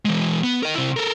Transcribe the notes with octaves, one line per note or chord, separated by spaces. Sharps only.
E3 G#3
B3
A#4 D#5
C3 E4
A4 A#4